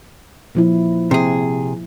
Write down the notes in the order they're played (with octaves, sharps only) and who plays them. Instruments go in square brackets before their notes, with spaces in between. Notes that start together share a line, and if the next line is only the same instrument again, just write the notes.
[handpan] A#2 F3 E4
[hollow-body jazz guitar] C3 G#4